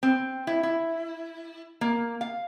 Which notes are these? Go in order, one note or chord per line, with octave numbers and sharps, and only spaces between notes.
C4
E4
E4
A#3
F5